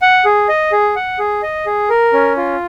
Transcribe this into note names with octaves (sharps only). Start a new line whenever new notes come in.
F#5
G#4
D#5
G#4
F#5
G#4
D#5
G#4
A#4
C#4
F4